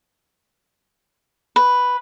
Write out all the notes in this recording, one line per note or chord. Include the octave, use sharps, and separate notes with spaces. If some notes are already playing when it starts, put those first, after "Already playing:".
B4